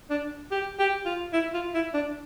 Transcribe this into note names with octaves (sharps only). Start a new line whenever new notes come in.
D4
G4
G4
F4
E4
F4
E4
D4